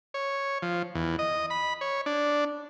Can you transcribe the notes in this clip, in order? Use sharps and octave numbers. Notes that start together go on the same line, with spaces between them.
C#5
F3
E2
D#5
B5
C#5
D4